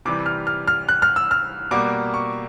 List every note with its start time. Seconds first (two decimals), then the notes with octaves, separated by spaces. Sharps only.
0.05 C3 E3 G3 D6
0.26 F6
0.47 F6
0.67 F6
0.89 F#6
1.02 F6
1.16 E6
1.31 F6
1.71 B2 G3 A#3 D6
2.14 C#6